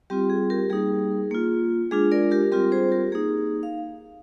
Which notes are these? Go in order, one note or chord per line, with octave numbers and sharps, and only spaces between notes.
G3 C4 F4 G4
G#4
G4 A#4
G3 A#3 D#4 G#4
A#3 F4
G#3 D4 F4 G#4
A#4 D5
G4 A#4
G3 C4 F4 G4 A#4
G#4 C5
G4 A#4
A#3 D#4 G#4
F5